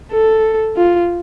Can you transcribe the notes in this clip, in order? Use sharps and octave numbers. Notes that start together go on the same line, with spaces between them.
A4
F4